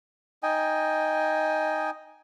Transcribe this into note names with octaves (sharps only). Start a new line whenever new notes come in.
D#4 D#5 G5 G#5